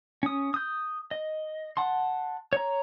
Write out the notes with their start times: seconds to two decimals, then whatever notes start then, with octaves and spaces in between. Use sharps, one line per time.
0.23 C#4 D#6
0.54 D#6 G6
1.11 D#5
1.77 F#5 A5 C6
2.53 C#5 A#5